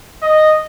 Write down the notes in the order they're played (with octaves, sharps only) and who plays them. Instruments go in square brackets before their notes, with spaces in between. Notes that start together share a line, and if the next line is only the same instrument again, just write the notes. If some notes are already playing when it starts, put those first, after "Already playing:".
[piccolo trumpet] D#5